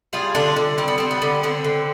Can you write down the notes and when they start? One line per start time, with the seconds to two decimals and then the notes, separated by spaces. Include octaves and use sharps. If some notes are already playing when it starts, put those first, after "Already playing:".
0.13 G3 F4 G#4
0.35 D3 D4 F4
0.56 D3
0.78 G3 C4
0.88 B3
0.98 G3 C4
1.11 B3
1.22 D3
1.43 D3 C4
1.64 D3